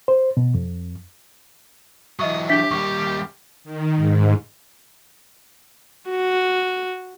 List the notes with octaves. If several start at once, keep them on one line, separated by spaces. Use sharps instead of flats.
C5
B2
F2
E3 F#3 D#5 E5 C#6 D#6
D4 G4 E5 B6
D#2 G3 C#6
D#3
G#2
F#4